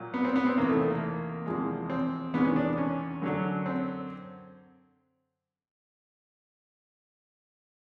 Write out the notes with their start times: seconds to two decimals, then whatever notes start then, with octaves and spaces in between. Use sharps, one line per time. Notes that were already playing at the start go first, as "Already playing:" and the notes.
Already playing: A#2 F#3
0.14 B3
0.25 C4
0.36 B3
0.47 C4
0.57 E2 C3 D#3 A#3
0.69 A3
0.80 A3
0.91 A#3
1.46 E2 C3 F3 G#3
1.90 C4
2.34 E2 C3 D#3 G#3 B3
2.45 C#4
2.56 D4
2.78 C#4
3.22 F#2 D3 F#3
3.66 C4